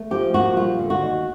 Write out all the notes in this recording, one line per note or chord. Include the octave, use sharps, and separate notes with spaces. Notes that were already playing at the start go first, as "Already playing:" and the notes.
Already playing: A3
F3 G4
A#2 F#4
G3 F4
D3
F#4
D#2